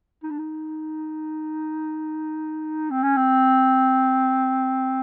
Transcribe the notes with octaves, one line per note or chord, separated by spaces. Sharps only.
D#4
D4
D#4
C4
C#4
C4